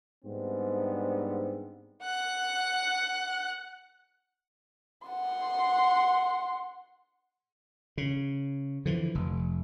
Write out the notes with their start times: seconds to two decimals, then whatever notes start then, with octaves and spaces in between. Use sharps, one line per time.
0.24 G#2 G3 B3 C4 D4
2.03 F#5 F#6
5.08 F#5 C6
7.97 C#3
8.86 D3 E3 F3
9.15 F1